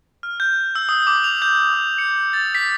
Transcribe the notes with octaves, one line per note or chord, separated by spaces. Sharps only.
F6
G6
E6
D#6
D6
F7
G6
D#6
C#7
A6
B6